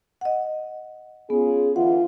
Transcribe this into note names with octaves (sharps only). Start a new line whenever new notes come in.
D#5 F#5
B3 C#4 F4 G#4
D3 E3 F4 F#5